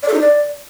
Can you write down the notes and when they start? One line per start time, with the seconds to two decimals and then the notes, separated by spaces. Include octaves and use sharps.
0.03 D5
0.08 A4
0.14 D#4
0.19 D5